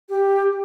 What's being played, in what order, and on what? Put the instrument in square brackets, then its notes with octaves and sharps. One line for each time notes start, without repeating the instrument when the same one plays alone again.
[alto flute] G4